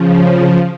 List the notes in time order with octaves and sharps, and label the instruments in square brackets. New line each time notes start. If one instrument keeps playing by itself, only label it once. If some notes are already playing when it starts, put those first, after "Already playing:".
Already playing: [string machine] C#3 F3